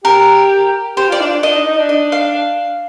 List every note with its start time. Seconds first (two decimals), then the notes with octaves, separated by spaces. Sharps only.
0.04 G4 A#4
0.96 G4 C5
1.09 F4
1.12 D5
1.20 D4
1.43 D4 D#5
1.54 D#4
1.66 D#4
1.78 D4
1.89 D#5
2.12 F5